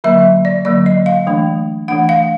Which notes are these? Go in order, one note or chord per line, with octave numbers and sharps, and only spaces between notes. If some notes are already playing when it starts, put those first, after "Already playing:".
D3 F#3 A#3 E5
D5
D3 F#3 A#3 D5
D#5
F5
E3 A3 D4
E3 A3 D4 F#5
F5